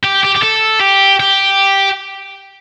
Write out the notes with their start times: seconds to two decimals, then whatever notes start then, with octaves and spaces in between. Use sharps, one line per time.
0.04 G4
0.25 G4
0.36 G4
0.43 A4
0.81 G4
1.20 G4